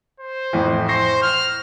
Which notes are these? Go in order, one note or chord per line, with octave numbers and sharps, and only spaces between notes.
C5
F2 A2 E3
C5 C#6 A#6 C7
F6